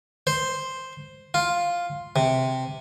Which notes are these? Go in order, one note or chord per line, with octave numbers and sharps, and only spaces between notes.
C5
F4
C3